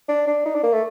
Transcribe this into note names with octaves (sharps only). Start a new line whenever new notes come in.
D4
D4
D#4
D4
A#3
A3